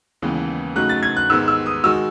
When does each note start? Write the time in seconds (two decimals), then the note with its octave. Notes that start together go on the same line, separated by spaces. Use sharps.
0.22 D#2 C#3 E3 G#3 B3
0.76 C#3 F#3 A3 D#4 F#4 F#6
0.89 A6
1.03 G#6
1.16 F#6
1.30 G#2 D#3 G#3 B3 E6
1.48 E6
1.66 D#6
1.84 D#3 G#3 D#4 F#4 E6